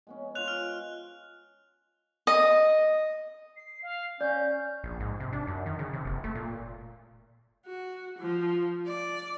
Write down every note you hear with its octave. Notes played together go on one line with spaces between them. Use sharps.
G#3 B3 C#4
F4 C5 D#5 F#6 F7
F6
D#5
C7
F5
C#4 D5 G6
A#1
G#2
C3
D4
F#2
D#3
C#3
C3
F#1
A3
A#2
F#4
F3
D5